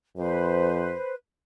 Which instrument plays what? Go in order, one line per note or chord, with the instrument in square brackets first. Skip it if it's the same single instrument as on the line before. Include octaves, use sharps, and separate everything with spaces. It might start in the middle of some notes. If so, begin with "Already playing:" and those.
[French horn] F2 [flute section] B4 C5